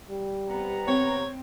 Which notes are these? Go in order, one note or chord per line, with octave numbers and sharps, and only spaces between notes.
G3
C3 B3 A#5
C4 C#5